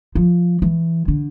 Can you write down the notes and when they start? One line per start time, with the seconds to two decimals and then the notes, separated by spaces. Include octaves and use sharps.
0.15 F3
0.62 E3
1.08 D3